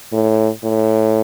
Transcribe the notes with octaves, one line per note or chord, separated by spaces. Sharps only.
A2
A2